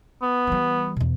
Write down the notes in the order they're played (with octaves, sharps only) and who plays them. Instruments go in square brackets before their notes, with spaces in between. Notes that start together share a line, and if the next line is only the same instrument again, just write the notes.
[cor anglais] B3
[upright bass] E3 G3
E2 B2